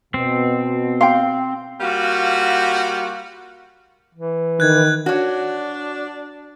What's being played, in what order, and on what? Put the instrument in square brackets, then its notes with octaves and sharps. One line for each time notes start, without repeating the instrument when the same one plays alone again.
[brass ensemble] B2 [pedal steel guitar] C4
[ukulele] F5 [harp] G5 C6
[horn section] G3 A#3 F4 F#4
[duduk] E3
[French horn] D#3 [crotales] F#6 G#6
[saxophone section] D4 [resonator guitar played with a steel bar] F#4 C#5